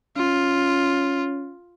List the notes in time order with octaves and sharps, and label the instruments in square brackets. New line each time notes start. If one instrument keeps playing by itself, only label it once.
[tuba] C#4 [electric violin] F4